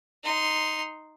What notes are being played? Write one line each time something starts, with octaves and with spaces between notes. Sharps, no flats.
D#4 C6